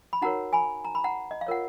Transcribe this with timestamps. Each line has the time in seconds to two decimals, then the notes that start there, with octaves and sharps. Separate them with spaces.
0.13 B5
0.22 D#4 F#4 A#4 C#5 F#5 A#5
0.53 G#5 B5
0.85 A#5
0.95 B5
1.04 F#5 A#5
1.31 D#5
1.41 F5
1.47 F4 A#4 C#5 F#5